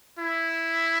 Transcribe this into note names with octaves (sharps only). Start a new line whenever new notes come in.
E4